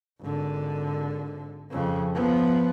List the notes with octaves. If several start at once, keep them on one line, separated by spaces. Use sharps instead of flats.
G#1 D3
F2 C#3
F3 B3